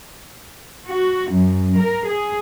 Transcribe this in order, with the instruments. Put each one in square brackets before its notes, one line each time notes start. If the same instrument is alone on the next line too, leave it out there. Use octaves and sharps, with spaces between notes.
[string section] F#4
F#2
A#4
G#4